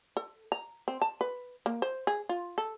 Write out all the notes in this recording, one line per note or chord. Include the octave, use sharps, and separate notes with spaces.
A4
A#5
C4
A5
B4
A#3
C5
G#4
F4
A4